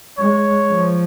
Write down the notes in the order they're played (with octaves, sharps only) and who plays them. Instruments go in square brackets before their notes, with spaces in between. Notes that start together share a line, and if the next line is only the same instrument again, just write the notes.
[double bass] G#3 [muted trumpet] C#5
[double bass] F3